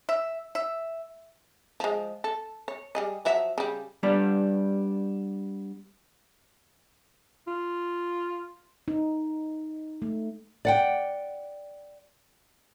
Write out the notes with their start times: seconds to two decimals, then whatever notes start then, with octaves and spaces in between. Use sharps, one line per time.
0.09 E5
0.55 E5
1.80 F3 G#3
2.24 A4
2.68 C#5
2.95 G3 G#4 D#5
3.25 F3 F#3 E5
3.58 C#3 G3
4.03 G3 B3 D4
7.48 F4
8.88 D#4
10.02 A3
10.65 D5 F#5 G5